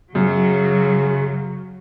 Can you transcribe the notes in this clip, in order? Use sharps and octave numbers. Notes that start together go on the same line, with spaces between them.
F#2 C#3 F#3